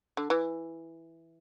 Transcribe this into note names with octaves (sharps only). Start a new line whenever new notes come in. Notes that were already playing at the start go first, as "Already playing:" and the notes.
D3
E3